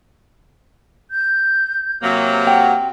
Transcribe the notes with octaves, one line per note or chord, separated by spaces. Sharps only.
G6
C3 F#3 A#3
F#5 G5